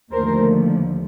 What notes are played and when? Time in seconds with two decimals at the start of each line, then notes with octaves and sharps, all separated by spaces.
0.12 D#2 D3 F3 A3 A#4 C5